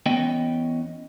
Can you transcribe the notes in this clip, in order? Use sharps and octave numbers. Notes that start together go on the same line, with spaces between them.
E2 B3 C#4 D#5 G5